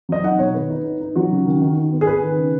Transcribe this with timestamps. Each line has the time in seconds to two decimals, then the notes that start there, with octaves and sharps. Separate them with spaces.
0.09 F#3 D#5
0.23 D#4 F#5
0.39 B2 C#5
0.55 D#3 B4
0.70 D#4
0.85 D#4
1.01 D#4
1.16 F#3 F#4
1.31 C#3
1.46 D#3
1.62 D#3
1.77 D#3
1.92 B3
2.01 G#4
2.07 B3 B4
2.23 D#3
2.38 C#3